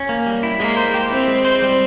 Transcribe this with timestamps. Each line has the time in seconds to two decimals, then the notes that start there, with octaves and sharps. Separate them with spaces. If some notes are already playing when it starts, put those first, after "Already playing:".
Already playing: C#4
0.09 A#3
0.26 G3
0.43 E4
0.60 G#3 A#3
0.77 C5
0.94 G4
1.11 C4 E4
1.28 G#3
1.45 C5
1.62 G3